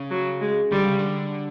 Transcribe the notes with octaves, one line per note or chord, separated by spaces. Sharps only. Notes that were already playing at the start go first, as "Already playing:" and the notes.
Already playing: C#3
F#3
G#3
D3 G3
C#3
D3